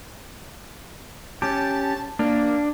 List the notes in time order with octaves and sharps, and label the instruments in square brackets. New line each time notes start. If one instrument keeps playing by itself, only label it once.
[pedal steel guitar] C#4 G4 [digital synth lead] A5
[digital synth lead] A#3 [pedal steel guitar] D4